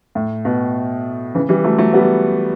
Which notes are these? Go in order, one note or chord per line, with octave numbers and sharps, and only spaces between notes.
A2
B2
C#3 E3
E3 G3
F#3 A3
F#3 A3
G3 B3